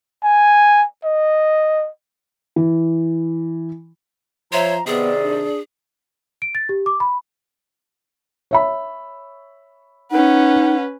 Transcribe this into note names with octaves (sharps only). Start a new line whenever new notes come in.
G#5
D#5
E3
F3 C5 C#5 E5 A#5
C3 D#3 B3 G#4 D5
D4
D7
A6
G4
D6
B5
C#5 E5 B5
C#4 D#4 B4 F#5